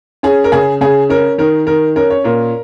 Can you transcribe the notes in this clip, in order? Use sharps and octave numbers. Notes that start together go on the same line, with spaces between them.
C#4 G#4
A#4
C#3 G#4
C#3 G#4
C#4 A#4
D#3 A#4
D#3 A#4
C#4 A#4
C#5
A#2 A#4